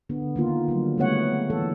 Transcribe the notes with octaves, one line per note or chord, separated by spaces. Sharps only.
D3 B3
D#3 A#3 F4
D3 F#3 G3
C#3 G3 A3 B3 C#5 F#5
E3 A4